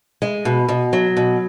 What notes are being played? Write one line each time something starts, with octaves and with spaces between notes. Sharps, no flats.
G#3
B2
B2
F#3
B2